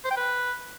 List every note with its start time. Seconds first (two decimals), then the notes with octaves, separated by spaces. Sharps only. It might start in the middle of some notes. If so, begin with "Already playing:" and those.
0.05 C5
0.11 G5
0.17 B4